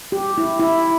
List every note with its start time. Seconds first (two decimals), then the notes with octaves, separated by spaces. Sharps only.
0.12 G4
0.38 E4
0.60 E4